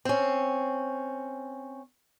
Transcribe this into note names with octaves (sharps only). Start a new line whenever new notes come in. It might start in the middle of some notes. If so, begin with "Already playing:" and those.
C4 C#4